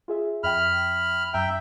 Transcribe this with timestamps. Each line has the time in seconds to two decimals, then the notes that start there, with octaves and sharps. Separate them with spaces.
0.08 F4 G#4 E5
0.43 F2 E5 G5 B5 F6
1.34 F#2 E5 G5 A#5